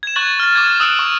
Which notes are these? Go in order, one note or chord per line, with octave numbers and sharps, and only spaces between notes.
G#6 E7
C#6 F#6 G#6 A6 F#7
F6 A6
D6 G#6
D#6 E6 F#6 D7
C#6